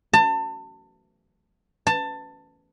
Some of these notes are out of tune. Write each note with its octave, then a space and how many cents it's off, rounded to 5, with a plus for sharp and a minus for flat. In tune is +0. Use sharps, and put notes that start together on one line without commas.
A5 +30
A5 +20